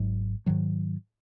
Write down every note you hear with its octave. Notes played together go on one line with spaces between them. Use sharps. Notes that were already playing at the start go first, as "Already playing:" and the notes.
Already playing: G#1 G#2 F#3
G#2 D#3 F#3